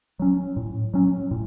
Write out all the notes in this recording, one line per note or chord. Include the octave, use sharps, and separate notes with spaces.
F#3 C#4
A2
F#3 C#4
A2